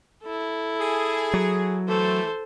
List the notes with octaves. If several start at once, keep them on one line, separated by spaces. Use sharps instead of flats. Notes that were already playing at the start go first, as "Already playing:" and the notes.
E4 A4
G#4
F#3
E3 A3 A4 C5